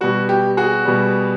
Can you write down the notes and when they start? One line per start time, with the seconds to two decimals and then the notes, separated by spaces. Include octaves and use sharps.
0.01 B2 G3 F#4
0.29 G4
0.57 F#4 G#4
0.85 B2 G3